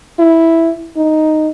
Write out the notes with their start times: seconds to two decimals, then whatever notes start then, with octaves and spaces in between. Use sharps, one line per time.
0.19 E4
0.96 D#4